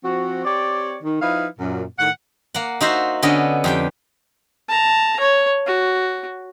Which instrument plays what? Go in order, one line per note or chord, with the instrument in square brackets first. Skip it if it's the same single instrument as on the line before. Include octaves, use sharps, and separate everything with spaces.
[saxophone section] F3 C4 F#4
C4 G4 C#5 D5
D#3
F3 D#4 E4 B4 F5
F#2 A#2
A2 D#3 F#5
[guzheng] A#3 F#5
D#4 F#4 C5 E5
D3 B3 C#4 D#5
F2 G4 G5
[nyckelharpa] A5 A#5
C#5
F#4